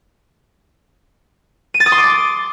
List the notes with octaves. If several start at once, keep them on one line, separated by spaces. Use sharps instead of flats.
D#7
A6
D#6
C6
D6